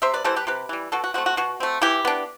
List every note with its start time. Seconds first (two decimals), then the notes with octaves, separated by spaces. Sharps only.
0.02 C3 C5 E5
0.14 B4 D5
0.24 E3 G3 A4 C5
0.36 G4 B4
0.47 C3 G4 B4
0.69 E3 G3
0.92 B2 F#4 A4
1.04 F#4
1.14 A3 C4 F#4
1.26 F#4
1.37 B2 F#4
1.60 A3 C4
1.82 E3 E4 G4
2.05 B3 D4